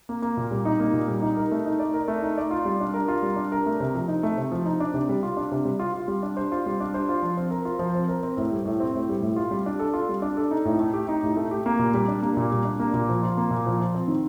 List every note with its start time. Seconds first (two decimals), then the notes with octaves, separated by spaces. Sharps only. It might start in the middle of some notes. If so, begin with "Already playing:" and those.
0.09 A#3
0.22 A#3
0.37 A#2
0.51 G3
0.65 D#4
0.80 A#3
0.93 A#2
1.08 G3
1.22 D#4
1.37 A#4
1.51 A3
1.66 D#4
1.79 D5
1.94 A#4
2.08 A3
2.22 D#4
2.38 D5
2.51 F4
2.65 G3
2.80 D4
2.94 A#4
3.08 F4
3.23 G3
3.36 D4
3.52 A#4
3.66 A3
3.80 C3
3.94 F3
4.08 D#4
4.23 A3
4.37 C3
4.52 F3
4.65 D#4
4.80 D4
4.94 C3
5.09 G3
5.23 F4
5.37 D4
5.52 C3
5.65 G3
5.79 F4
5.94 F4
6.08 G3
6.23 D4
6.37 C5
6.52 F4
6.66 G3
6.80 D4
6.94 C5
7.09 F4
7.23 F3
7.37 C4
7.51 A#4
7.65 F4
7.79 F3
7.94 C4
8.08 A#4
8.23 C4
8.37 A2
8.52 G3
8.65 A2
8.80 C4
8.94 A2
9.09 G3
9.22 A2
9.36 F4
9.51 G3
9.66 D4
9.79 A4
9.94 F4
10.09 G3
10.22 D4
10.37 A4
10.51 D#4
10.65 A2
10.80 A3
10.94 G4
11.08 D#4
11.23 A2
11.37 A3
11.51 G4
11.66 A#3
11.79 A#2
11.94 G3
12.08 D4
12.22 A#3
12.37 A#2
12.52 G3
12.65 D4
12.79 A#3
12.94 A#2
13.09 F3
13.23 F4
13.37 A#3
13.51 A#2
13.66 F3
13.80 F4
13.95 C4
14.08 D#3